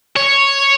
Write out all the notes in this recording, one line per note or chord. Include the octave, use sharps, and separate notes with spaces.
C#5